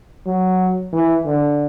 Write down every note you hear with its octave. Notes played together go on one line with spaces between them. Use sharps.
F#3
E3
D3